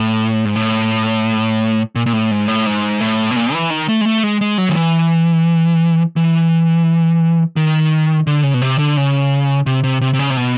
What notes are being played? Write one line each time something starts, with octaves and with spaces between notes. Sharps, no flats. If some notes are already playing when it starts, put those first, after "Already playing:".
Already playing: A2
G#2
A2
A#2
A#2
A2
G#2
A2
G#2
A2
B2
A#2
E3
D#3
A3
G#3
A3
G#3
G#3
F#3
D#3
E3
E3
D#3
D3
C#3
B2
C3
D3
C#3
C3
C3
C3
C3
C#3
C3
B2